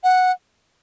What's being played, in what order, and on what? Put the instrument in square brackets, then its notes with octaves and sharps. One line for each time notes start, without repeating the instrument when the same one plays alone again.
[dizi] F#5